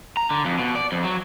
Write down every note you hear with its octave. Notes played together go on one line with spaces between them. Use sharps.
A#5
D3
F2
B2
D5
F2
F#3